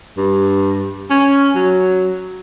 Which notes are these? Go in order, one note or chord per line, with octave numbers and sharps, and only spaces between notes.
G2
C#4
F#3